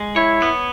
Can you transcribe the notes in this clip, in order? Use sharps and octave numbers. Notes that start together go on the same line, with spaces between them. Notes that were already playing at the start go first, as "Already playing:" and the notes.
Already playing: G#3
E4 C#5
B3